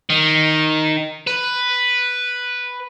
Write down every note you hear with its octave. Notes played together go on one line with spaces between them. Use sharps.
D#3
B4